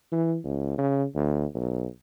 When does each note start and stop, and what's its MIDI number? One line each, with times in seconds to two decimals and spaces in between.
0.12 0.37 52
0.44 0.73 37
0.78 1.04 49
1.15 1.46 38
1.55 1.86 35